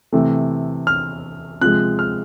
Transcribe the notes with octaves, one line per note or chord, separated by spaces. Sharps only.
C3 E3 A3
F6
C3 F3 G#3 F#6
F6